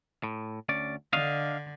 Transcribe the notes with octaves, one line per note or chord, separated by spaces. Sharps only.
A2
D2 C#4 D5
D3 D4 D#5 F5